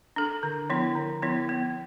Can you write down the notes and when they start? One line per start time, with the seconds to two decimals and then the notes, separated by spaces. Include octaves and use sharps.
0.16 D4 A4
0.43 D3
0.70 F3 B3 E4
0.95 D3
1.22 F3 B3 E4
1.49 B3